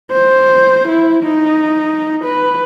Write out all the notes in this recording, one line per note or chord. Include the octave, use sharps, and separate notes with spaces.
C5
E4
D#4
B4